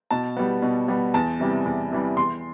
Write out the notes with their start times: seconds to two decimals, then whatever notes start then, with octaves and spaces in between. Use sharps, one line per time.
0.11 B2 A5
0.37 G3 B3
0.63 B2
0.88 G3 B3
1.14 E2 A5
1.40 C3 E3 G3
1.65 E2
1.92 C3 E3 G3
2.17 E2 C6